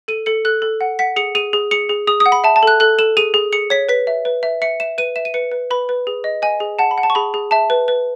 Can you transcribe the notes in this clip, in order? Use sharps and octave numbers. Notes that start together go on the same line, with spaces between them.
A4 D#7
A4 C#7
A4 F#6
A4
F#5
F#5 B6
G#4 C#7
G#4 D#7
G#4
G#4 C#7
G#4
G#4 D#6
D#6
F#5
B5
E5 A5
A5
A4 F#6
A4 F#6
A4 E7
G#4 D#7
G#4
G#4 C#7
C#5 B6
B4 B6
E5
B4
E5
E5 C#7
E5 E7
B4 D#7
E5 E7
D#7
B4 C#7
B4
B4 B5
B4
G#4
D#5
D#5 G#5
G#4
F#5 A5
B5
F#5
A5
C#6
G#4 B5
G#4
E5 A5
B4
B4